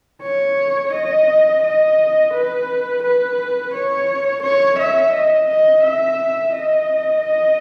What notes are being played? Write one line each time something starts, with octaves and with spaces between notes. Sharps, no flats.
C#5
D#5
D#5
B4
B4
C#5
C#5
E5
D#5
D#5
E5
D#5
D#5